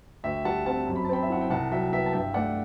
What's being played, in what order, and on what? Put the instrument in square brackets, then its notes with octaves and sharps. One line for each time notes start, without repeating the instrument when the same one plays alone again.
[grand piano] D2 E5 G5
G3 F#5 A5
C4 F#5 A5
F#2
B5
A5
C4 G5 B5
E5
E4 F#5
G5
C2 F#5 A5
F#3 E5 G5
B3 E5 G5
A5
G2 E5 G5
A3 D5 F#5